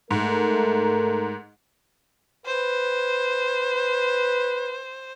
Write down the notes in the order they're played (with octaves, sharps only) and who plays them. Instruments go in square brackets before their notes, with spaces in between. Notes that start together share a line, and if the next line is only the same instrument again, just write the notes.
[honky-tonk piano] G#2 [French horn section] A3 A#4
[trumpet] B4 [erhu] C5